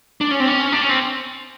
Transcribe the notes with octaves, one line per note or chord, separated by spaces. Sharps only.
D4
C#4
C4
C#4
D4
C#4
C4